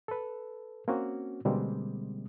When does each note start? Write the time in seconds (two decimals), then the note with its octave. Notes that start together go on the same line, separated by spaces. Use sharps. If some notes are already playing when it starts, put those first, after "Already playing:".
0.08 A4 B4
0.88 A#3 C4 C#4 F#4
1.45 B2 D3 G3 G#3 A#3 C4